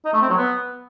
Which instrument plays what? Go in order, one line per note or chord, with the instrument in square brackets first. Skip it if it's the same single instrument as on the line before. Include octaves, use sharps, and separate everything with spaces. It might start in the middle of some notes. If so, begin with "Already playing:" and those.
[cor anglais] D#4
A3
C4
F#3
B3